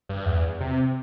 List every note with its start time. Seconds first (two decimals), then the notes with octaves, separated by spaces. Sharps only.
0.09 G2
0.26 E2
0.61 C3